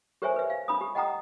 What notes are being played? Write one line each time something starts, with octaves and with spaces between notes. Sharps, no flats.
G4 A#4 C5 C#5 E5 G#5
B4 E5
F5
D4 B5 D#6
G4
D#5 F#5 G5 A#5 D#6